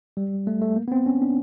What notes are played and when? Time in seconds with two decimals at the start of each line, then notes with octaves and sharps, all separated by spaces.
0.17 G3
0.47 A3
0.62 A3
0.76 A#3
0.88 B3
0.92 C4
1.06 C#4
1.22 D4